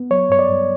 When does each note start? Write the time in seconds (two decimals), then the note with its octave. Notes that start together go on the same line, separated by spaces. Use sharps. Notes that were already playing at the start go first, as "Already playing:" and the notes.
Already playing: B3
0.10 F#3 C#5
0.30 G2 C#5
0.39 D5
0.49 G2